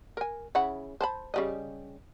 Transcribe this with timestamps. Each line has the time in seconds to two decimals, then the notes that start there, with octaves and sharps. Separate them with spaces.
0.17 A#4 G#5
0.55 C#3 E4 F#5
1.01 C5 A5 B5
1.34 C#3 G3 D#5